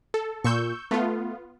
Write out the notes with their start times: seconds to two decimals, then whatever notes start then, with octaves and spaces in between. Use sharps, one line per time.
0.14 A4
0.44 A#2 C#6 E6 G6
0.91 A3 B3 F4